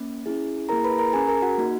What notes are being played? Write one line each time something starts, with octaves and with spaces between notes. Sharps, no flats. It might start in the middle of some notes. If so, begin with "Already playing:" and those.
Already playing: A#3 C#4
C#4 E4 G#4
A#3 E4 G#4 A#4 A#5
B4 B5
A#4 A#5
C#4 G#4 G#5
A#4 A#5
F#4 F#5
A#3 D#4 F#4